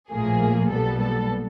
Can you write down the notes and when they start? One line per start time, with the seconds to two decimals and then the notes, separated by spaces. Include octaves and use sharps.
0.11 A#1 A2 F3 A#3 G#4
0.71 B1 A#2 G3 B3 A4
1.00 A4